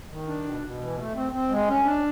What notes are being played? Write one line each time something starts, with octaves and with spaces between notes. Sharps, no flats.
D#3
D4
B2
B2
E3
A3
C4
C4
G#3
C#4
D4